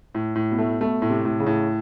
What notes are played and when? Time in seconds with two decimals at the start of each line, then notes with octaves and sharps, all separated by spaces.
0.15 A2
0.35 A2
0.51 B2
0.58 A3
0.81 B2 A3
1.02 A2
1.09 C3
1.25 A2
1.40 C#3
1.46 A2